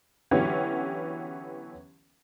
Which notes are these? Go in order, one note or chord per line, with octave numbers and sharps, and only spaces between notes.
D3 E3 F#3 B3 C#4 G4